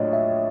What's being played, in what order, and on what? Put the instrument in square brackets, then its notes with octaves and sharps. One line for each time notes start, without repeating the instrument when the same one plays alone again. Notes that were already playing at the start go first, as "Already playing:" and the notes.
Already playing: [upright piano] A#1 A2 F#3 D4 [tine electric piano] C#5 D#5
[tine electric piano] E5